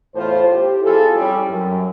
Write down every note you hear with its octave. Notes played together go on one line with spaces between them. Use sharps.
E2 A2 F4 C5
G4
F2 E4 F4 G#4 A4
G3 C#4
F#2